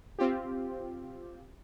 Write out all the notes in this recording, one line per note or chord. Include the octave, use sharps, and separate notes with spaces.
C4 F4 G4